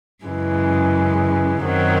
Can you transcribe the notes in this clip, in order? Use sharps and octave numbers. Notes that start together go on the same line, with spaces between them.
F#2 C#3 E3 G#3
F#2 D#3 F#3 C4 D#4